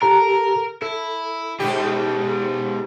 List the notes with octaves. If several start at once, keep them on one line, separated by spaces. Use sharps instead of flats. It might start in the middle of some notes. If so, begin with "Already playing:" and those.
G4 A4 A#4 A#5
E4 A4
G#2 B2 G#3 G4